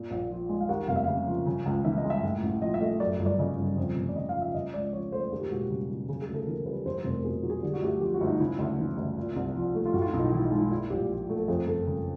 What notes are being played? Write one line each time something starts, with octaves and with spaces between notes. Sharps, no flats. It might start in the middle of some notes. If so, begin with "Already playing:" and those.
Already playing: A#2
A#1
F3
G#3
F5
D#2 F#5
F1 F5
E5
C#3 F5
F3
C#3
C#2
E3 E5
D#5
G#3
E5
A2
A1
F3 D#5
E5
A3 D#5
F#2 D5
G1
D5
C#3 D#5
G1
F2
F1
D5
C#3 D#5
F5
F3
E5
C#3 D#5
C#2 D5
F3 C#5
A3 C5
D#2 G#4
G4
E1 F#4
G4
C#3
F#3
C#3 G#4
G#4
D2
A4
E3 A#4
G3 B4
E2 C5
C5
F1
A#4
B2 G#4
F#3
G#4
D3 G4
F#4
D2 G4
F3 G4
F#4
D2
D#4
C#3 E4
D2
E3
D2
A#2
C2
F3
A3
F4
A2 F#4
F4
E4
B1
D#4
E3 E4
D#4
G#3
E4
A#2 E4
A#1 G4
F3
A3
A4
F2 G#4
F#1 A4
C#3